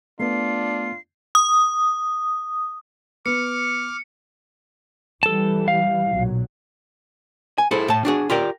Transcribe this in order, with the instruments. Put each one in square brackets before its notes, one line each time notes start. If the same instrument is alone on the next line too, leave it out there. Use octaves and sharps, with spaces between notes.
[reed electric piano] A3 B3 [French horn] D4 [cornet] F4 [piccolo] C7
[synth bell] D#6
[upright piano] B3 [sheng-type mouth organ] D6 F6 [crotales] C#7
[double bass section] E3 G3 [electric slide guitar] A4 A5
[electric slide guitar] F5
[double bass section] B1 A#2 F#3
[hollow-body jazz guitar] G#5
E4 G#4 A4 C5
A2 A5
D4 F#4 G#4
F4 G4 A#4 D5